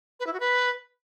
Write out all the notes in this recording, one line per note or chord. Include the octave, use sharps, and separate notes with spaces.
B4
E4
F#4
B4